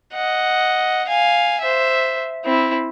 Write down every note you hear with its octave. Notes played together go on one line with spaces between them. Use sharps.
D#5 F#5
F5 G#5
C5 E5
C4 E4